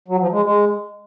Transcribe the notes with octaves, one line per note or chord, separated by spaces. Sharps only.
F#3
F3
G#3
G#3